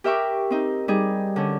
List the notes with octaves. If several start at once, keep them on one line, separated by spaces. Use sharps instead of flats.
G4 A#4 E5 G5 C#6
C4 D#4
G3 D#4 G#4
D3 C#4